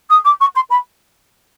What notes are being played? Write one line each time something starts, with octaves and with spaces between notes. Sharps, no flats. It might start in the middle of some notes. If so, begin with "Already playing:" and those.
D#6
D6
C#6
C6
B5